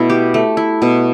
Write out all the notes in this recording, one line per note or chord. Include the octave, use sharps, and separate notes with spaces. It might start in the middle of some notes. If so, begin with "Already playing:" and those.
Already playing: B2 A3 E4
G4
A3
E4
B2